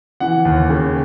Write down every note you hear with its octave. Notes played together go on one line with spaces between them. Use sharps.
E3 F#5
D#2
C#3 G5